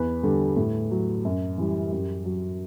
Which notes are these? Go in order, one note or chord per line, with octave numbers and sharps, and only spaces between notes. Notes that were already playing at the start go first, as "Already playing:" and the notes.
Already playing: E2 B4
D3 G3
A2
F#3
F#2
E3 G3
F#2 G4
F#3